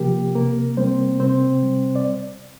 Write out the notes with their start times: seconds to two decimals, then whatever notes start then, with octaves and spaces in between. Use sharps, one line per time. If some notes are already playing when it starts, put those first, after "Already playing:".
Already playing: C3 F3 A#3 G4 A#4
0.35 C3 A#3 A#4
0.77 G3 C4 C5
1.20 C3 C4 C5
1.62 G3
1.96 D5